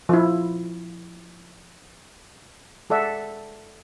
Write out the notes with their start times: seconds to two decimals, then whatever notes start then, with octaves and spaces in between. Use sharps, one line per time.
0.09 F3 E4
2.90 G#3 A4 D5 E5 F#5